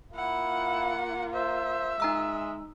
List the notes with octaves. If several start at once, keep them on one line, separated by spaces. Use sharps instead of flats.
A#3 E4 F4 F#5
C5 E5
G#3 D#4 A#5 E6